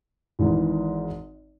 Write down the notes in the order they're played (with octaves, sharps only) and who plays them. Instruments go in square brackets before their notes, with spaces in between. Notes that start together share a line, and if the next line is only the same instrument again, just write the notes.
[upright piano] G#1 G#2 E3